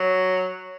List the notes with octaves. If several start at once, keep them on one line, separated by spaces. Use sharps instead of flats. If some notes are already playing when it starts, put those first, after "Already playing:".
Already playing: F#3